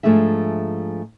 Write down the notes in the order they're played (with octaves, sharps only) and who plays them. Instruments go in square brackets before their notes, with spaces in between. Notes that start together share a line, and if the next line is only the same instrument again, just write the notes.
[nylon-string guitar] G#2 F3 A3 D4 G#4 E5